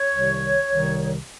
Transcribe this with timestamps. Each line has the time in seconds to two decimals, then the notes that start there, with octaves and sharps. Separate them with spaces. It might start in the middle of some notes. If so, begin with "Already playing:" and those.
Already playing: C#5
0.12 C2 C3 D#3
0.70 C2 C3 D#3